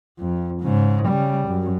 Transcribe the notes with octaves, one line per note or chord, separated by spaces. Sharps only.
F2
G#2 C#3
C#3 G3
F#2